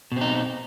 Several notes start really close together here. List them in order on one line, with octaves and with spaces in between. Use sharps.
B2 C4 D#4